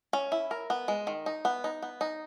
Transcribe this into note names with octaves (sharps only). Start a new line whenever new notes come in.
C#4
E4
A#4
B3
G#3
D#3
D#4
B3
D#4
B3
D#4